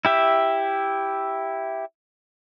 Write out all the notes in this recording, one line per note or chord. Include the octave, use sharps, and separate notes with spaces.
E4 G4 E5